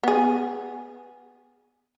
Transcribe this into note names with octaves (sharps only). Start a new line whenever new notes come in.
B3 G#4